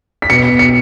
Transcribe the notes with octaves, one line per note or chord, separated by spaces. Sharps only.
B6
B2 C#7
C#7